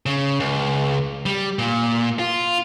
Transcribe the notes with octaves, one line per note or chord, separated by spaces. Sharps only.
C#3
C#2
G3
A#2
F4